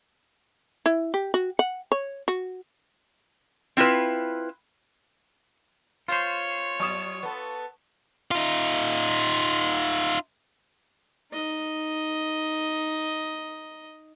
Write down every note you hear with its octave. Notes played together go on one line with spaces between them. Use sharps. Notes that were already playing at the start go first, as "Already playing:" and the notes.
E4
G4
F#4
F#5
C#5
F#4
C4 E4 F4 B4
F4 C5 C#5
F#3 C#6 D#6 E7
B3 A4
D#4 F4
D#4 D#5